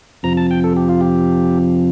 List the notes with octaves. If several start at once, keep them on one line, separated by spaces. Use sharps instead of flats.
F2 C3 F3 A#5
A5
G5
A4
G4
F4
G4